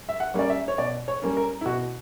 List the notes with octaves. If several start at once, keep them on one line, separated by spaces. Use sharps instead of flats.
E5
F#5
G3 A#3 C#4 D5
E5
C#5
B2 D5
C#5
G3 A#3 C#4
A#4
E4
B2 F#4